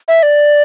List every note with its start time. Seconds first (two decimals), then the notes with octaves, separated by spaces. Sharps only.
0.08 E5
0.23 D5